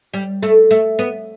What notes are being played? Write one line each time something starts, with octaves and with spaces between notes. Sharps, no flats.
G3
A3
A3
B3